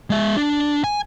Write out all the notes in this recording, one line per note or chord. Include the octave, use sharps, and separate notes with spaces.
G#3 E5
D4
G#5